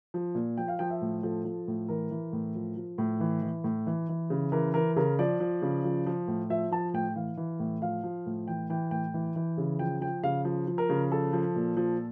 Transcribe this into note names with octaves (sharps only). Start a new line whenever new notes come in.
F3
A#2
F3 G5
F5
F3 G5
E5
A2
F3 A4
F3
A2
E3 A#4
E3
A2
F3
F3
A2
E3
E3
A2
E3
E3
C#3
E3 A#4
E3 A#4
C#3 A#4
F3 D5
F3
C#3
F3
F3
A2
F3 E5
F3 A5
A2 G5
E3 F5
E3
A2
F3 F5
F3
A2
E3 G5
E3 G5
A2 G5
E3
E3
C#3
F3 G5
F3 G5
C#3 F5
F3
F3
A#4
C#3
F3 A4
F3
A#2
F3